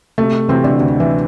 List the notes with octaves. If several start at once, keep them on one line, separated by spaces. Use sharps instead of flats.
C3 A3
C3 E3 C4
D3 D4
D2
E3 E4